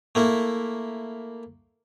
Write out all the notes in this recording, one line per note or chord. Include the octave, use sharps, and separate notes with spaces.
A3 A#3 E4